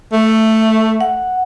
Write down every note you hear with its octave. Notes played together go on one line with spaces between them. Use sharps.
A3
F#5